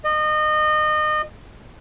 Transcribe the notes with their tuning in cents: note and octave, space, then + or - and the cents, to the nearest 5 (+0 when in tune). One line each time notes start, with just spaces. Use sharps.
D#5 -30